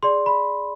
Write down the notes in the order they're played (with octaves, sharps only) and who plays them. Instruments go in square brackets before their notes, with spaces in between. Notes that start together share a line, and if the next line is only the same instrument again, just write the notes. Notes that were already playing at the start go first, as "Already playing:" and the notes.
[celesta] G#4 D5 C6
B5